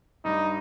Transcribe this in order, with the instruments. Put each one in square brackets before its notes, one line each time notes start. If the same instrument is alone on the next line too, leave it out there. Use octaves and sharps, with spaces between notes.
[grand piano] G2 G3 [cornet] D#4